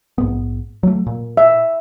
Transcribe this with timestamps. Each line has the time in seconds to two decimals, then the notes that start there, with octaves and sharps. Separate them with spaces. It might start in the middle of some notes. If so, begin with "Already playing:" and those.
0.18 A#1 G#2 B3
0.83 F#3 A3
1.06 A#2
1.37 E5